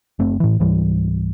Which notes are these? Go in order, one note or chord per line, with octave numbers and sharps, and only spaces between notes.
F#1 A3 C4
A2 E3
C#2 G#2 E3 G3